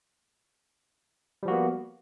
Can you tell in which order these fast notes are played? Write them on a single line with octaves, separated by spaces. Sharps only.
G3 F3 F#4 A#3 B3